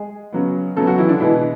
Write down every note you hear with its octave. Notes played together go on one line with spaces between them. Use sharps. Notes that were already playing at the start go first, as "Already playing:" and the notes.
Already playing: G#3 G#4
C#3 F#3 B3
C#3 F#3 A3 B3 A4
F#3 F#4
E3 E4
D3 D4
B2 E3 G#3 B3 E4